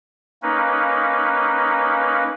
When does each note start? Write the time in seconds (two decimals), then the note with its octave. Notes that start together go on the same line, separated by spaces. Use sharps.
0.42 A#3 C#4 D#4 B4